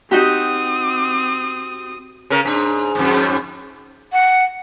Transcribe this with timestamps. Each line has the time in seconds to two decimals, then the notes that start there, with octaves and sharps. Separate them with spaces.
0.11 C4 D#4 F#4 G4 D#6
2.30 C#3 A#4
2.45 G#2 D4
2.95 F2 G#2
4.12 F#5